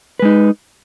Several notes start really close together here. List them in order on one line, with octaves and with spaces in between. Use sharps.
B4 G#3 D#4